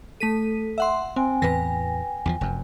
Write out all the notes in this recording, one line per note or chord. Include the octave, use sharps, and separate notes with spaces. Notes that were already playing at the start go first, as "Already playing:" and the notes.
A3 A4 B6 D#7
E5 F#5 C6
C4 G5 G#5
E2 A2 E3 B4 A#6
E2 D#3 F3
F1 F#2